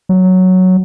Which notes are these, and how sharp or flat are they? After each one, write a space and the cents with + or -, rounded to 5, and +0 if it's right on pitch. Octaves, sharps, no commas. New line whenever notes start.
F#3 +0